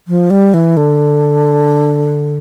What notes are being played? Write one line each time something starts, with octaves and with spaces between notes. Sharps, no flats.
F3
G3
E3
D3